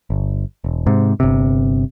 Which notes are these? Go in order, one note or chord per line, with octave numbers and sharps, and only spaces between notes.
G1
E1
G#2 C3
G1 C3